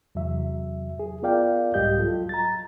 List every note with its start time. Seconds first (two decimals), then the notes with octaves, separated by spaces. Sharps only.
0.15 E2 C3 F#3 E5
0.99 G#4
1.23 B3 F4 A#4 D5 F5 G5
1.74 C2 G#2 G3 G4 D#5 G6
1.98 F#3 F4 A4
2.29 A#5 A6